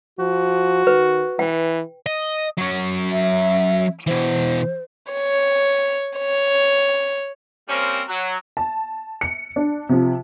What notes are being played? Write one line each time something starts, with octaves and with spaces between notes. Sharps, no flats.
F3 F#4
D#3 B4
E3 G5
D#5
F#3 C#4
E5
B2 E3 C5
C#5
C#5
G3 A#3 C4 C#4 A#4 C5
F#3
A5
C#7
D4
C3 F3